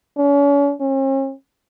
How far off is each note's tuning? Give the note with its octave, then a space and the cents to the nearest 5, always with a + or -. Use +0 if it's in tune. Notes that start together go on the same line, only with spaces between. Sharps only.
C#4 +40
C#4 -45